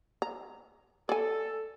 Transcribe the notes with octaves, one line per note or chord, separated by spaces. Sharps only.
A#5
A4 D5 G#5